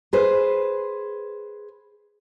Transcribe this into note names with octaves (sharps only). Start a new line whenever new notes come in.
G#4 B4 C5